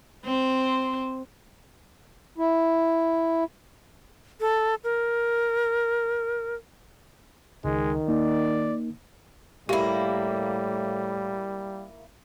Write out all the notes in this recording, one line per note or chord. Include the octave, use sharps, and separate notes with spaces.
C4 C5
E4
A4
A#4
C#2 D#3 G#3
A#3 D#4 D5
A2 G3 A#3 E4 G4